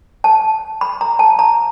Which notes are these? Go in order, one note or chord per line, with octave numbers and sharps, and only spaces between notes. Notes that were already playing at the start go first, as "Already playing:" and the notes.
A5
B5
A#5
A5
A#5